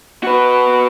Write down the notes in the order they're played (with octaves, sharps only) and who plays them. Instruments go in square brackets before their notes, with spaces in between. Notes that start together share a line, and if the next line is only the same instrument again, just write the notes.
[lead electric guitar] F#4 B4